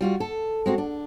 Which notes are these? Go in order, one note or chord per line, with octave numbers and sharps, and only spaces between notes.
G3 F4 F#4
A4
G#3 C4 F#4
D4